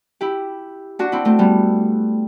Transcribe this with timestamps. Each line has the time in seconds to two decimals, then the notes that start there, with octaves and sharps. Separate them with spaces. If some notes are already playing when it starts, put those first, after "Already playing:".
0.21 E4 G4
0.99 D4 F#4
1.12 C4 E4
1.25 A3 C4
1.39 G3 B3